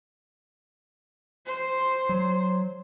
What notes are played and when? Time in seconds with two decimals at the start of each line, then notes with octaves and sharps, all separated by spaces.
1.46 C5
2.09 F#3